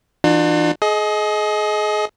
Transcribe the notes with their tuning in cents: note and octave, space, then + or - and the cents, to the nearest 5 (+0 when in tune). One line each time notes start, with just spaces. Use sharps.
E3 +0 D4 +40 F4 +40
G#4 +35 D#5 +10